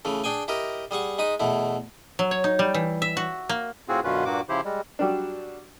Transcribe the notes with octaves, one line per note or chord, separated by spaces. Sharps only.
C#3 E3 A3
D4 G#4 G5 G#5
E4 G4 A#4 D#5
G3 G#4 F#5 C#6
G#3 D#4 B5 D#6
E2 B2 A3 E4
F#3
C#5
D#4
G3
E3
E5
F#4
A#3
A2 C4 F4 F#4 G#4
F#2 B2 D3 C#4 F4 B4
G2 A#2 A#3 F#4 D6
C#3 F3 E4 G4 C5
G3 G#3
F#3 G3 D4